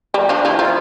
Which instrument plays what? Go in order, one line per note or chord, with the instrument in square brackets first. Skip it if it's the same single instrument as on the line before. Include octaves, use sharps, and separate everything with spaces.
[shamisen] G3
[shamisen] F3 [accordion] D4
[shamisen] F3 [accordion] E4
[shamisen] F3 [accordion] F4